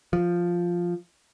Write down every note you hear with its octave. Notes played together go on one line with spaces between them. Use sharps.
F3